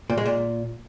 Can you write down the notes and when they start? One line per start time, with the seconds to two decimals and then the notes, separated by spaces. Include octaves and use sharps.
0.10 A#2
0.18 G#3
0.26 A#2